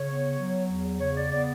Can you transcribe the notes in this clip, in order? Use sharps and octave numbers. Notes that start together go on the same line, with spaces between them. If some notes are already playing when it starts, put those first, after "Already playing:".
Already playing: C#3 C#5
B3
F#3
E2
C#3 C#5
D5
B3 D5